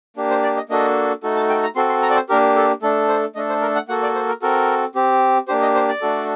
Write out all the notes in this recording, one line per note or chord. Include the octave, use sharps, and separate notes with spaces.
A#3 D4 G4
C5
D5
D#5
A#3 D4 F#4 A4 D#5
A3 D#4 F#4 A4
A5
G5
A#5
C4 F#4 A4 C6
C6
A#5
D5
C5
A#3 D4 G4 A#4
A4
A3 D4 A4
C5
A3 D4 A4 D#5
C5
A#4
F#5
A#3 F#4 A4 F#5
D5
C5
A#4
C4 F#4 A4 A#4
C4 G4
A#3 D4 G4 C5
D#5
C5
D5
A3 D4 F#4 A4